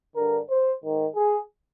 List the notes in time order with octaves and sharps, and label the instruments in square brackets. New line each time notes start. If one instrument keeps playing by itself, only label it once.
[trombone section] G2 D3 A#4
C5
G#2 D#3
G#4